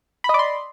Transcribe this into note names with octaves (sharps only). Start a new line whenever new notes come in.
D5 D#5 B5 C6